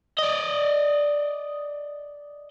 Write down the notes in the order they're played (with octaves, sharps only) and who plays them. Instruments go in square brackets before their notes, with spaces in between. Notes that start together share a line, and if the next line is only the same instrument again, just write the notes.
[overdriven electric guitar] D5 D#5